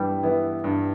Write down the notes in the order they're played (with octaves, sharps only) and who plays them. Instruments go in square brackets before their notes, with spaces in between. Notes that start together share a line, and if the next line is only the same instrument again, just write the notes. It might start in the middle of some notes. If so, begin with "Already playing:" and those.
Already playing: [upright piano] G2 E3 B3 E4 [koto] G3
[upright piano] E3 B3 E4
G2